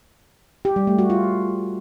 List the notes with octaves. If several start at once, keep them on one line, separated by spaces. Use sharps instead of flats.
G4
G3
A3
F#4
F4